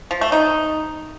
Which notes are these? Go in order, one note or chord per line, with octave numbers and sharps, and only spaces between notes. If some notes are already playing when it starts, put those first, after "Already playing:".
F3
A3
D#4